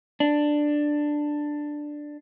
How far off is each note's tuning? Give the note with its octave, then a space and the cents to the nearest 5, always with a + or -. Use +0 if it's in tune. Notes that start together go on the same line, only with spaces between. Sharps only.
D4 +10